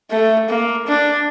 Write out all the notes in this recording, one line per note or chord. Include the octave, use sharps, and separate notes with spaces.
A3
A#3
D4